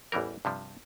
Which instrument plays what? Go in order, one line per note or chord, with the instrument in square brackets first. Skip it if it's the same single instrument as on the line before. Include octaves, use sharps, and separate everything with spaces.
[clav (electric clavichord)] A1 E2 E3 G3 A#4
G2 C3 F3